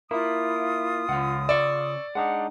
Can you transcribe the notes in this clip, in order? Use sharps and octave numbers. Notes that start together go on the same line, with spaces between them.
A#3 E4 F4 D#6
C#2 C#3 F#5
D5 C#6 E6
G#3 D4 D#4 F#5